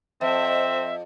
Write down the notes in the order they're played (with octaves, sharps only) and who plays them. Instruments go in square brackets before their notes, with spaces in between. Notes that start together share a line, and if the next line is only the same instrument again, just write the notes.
[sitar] F2 [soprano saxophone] C4 [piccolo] E5